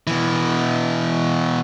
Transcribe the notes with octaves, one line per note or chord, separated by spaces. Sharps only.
B2 E3